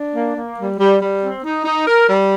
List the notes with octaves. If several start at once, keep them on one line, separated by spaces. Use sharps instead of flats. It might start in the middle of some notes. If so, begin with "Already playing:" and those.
Already playing: D4
A#3
A#3
G3
G3
G3
C4
D#4
D#4
A#4
G3